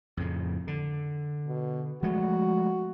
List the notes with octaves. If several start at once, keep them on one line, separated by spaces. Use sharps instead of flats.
F2 A2 C#3
D3
B2
F3 G#3 A3 F#4